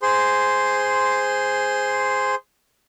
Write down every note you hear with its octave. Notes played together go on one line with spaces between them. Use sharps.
G#4 C5 C6